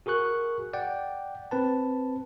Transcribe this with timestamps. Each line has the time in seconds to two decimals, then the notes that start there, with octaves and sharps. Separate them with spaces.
0.06 F#4 G#4 A#4 C#6 F#6
0.73 D5 F#5 G5
1.51 C4 B4 A5